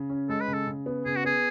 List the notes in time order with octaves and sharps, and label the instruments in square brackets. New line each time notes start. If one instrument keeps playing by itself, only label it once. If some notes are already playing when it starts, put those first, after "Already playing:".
Already playing: [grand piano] C#3
C#4
[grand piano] G#3 [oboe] A4
[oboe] B4
[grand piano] C#3
[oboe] A4
[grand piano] C#3
B3
[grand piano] C#3 [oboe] G#4
[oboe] F#4
[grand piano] B3 [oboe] G#4